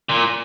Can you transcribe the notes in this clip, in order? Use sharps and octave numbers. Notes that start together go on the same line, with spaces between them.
A#2